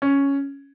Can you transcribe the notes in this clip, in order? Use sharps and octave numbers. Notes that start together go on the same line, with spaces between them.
C#4